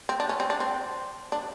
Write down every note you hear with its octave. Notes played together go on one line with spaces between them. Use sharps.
C4
D4
C#4
C4
D4
C4
D4